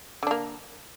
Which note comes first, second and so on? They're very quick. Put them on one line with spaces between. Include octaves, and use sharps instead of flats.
D3 D4 A#3